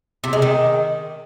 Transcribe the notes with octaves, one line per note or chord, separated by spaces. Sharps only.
C3
G#3
D#3